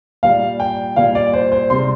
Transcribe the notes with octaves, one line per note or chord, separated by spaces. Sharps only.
A#2 G3 F5
G5
A#2 G3 F5
D5
C5
C5
C3 G3 C6